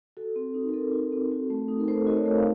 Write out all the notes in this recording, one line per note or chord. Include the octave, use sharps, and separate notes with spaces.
F#4 A4
C4
D#4
A#4
C4 A4
F#4
C4
F#4
A3
D#4
A#4
A3 A4 C5
F#4 D#5
A#4 C#5
A3
F5